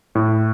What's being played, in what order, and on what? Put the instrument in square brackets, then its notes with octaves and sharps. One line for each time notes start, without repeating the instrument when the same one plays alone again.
[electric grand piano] A2